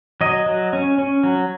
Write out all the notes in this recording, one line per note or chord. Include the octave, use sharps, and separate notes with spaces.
F#3 D#5
F#3
C#4
C#4
F#3